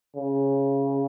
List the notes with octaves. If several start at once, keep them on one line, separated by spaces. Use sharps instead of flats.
C#3